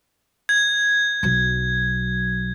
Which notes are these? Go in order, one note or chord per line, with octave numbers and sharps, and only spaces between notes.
G#6
B1 F#3